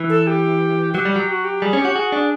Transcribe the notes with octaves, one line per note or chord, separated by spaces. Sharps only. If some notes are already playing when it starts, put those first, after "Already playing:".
Already playing: E3
A4
G4
F#3 G4
G3
F#3
F#4
G4
G3 G#4
C#4
G4
F#4
F#4 G#4
D4